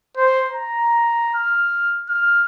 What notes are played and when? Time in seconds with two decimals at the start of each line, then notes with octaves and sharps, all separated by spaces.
0.17 C5
0.51 A#5
1.34 F6
2.09 F6